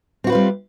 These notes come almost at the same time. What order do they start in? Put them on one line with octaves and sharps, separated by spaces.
C4 F#4 B4 F4 G3